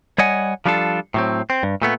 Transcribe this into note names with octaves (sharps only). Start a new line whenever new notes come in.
G3 C#5 D#5 F#5 G#5
F3 G3 D4 F4 A4
A2 F#3 C4
C4
G2
A#2 A3 B3